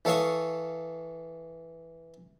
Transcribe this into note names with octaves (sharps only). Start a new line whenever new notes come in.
E3 A4 C#5 F5 C#6 D#6